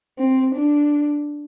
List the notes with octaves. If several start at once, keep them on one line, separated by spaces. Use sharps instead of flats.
C4
D4